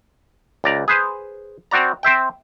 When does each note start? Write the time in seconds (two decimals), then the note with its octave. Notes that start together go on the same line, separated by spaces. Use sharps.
0.64 C#2 D5 A#5
0.88 G#4 B4 C5
1.71 C4 F#4 D5 A#5
2.03 C4 C5 E5 G5